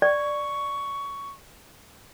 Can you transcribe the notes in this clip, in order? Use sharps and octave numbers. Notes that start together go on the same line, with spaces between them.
D5 C#6